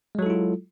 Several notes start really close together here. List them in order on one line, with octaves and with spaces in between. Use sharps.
G#3 F#3 A4 E4 F4